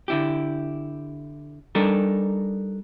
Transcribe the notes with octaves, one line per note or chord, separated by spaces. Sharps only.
D3 E4 G4
G3 D4 D#4 A4 A#4